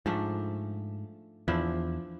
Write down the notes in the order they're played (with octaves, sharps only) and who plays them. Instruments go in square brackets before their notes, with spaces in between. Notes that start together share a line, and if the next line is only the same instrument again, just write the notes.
[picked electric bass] G#2 [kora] F3 A3 D4
[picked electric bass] E2 [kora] F3 D4 E4